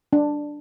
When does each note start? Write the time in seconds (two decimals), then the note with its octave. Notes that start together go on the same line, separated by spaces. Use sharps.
0.13 D4